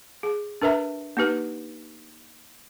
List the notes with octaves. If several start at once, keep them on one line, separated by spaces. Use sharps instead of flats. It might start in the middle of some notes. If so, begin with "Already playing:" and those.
G#4
D4 A#4 B4 E5 A#5
A#3 D#4 G4 B4